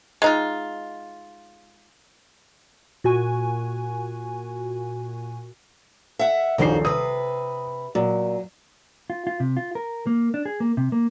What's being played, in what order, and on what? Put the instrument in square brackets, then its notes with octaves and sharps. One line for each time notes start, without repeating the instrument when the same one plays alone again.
[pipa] G#3 D#4 F4
[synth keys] A#2 F#4 G#5
[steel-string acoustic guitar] E5 F#5
[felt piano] D#1 A#1 C7 [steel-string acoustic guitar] F2 D#4 F#4
[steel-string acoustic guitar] C3 B4 [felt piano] D#6
[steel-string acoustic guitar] A#2 [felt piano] F#3
[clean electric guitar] F4
F4
C3
F4
A#4
A#3
D4
G#4
A#3
C3
A#3